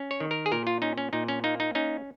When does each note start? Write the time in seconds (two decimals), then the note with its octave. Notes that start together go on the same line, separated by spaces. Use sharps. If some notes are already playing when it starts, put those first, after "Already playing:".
Already playing: C#4
0.11 C#5
0.20 D#3
0.31 A#4
0.46 G#4
0.52 A#2 A#4
0.67 F4
0.82 C#4 D#4
0.98 C#4
1.13 A#2 D#4
1.28 C#4
1.44 A#3 D#4
1.60 D#4
1.75 C#4 D#4